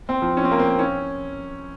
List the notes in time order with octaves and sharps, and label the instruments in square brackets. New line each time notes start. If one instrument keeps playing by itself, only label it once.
[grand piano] C4
F3
C#4
C4
A#3
C4
C#4